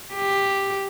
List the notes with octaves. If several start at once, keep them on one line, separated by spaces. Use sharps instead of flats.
G4